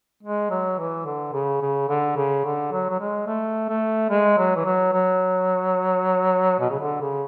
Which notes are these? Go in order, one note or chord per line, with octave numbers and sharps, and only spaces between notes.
G#3
F#3
E3
D3
C#3
C#3
D3
C#3
D3
F#3
F#3
G#3
A3
A3
G#3
F#3
E3
F#3
F#3
B2
C#3
D3
C#3